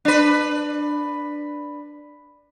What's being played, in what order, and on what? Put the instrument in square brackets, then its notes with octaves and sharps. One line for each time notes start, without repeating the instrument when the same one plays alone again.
[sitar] D4 B4